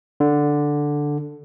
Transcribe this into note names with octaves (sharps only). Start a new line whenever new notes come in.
D3